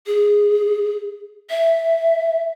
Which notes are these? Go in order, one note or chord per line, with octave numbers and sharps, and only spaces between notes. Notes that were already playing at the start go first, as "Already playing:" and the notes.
G#4
E5